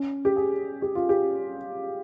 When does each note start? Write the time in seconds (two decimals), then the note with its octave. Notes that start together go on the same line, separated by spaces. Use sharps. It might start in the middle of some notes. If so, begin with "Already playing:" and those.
Already playing: C#4
0.25 G4
0.36 G#4
0.82 G4
0.95 F4
1.09 G4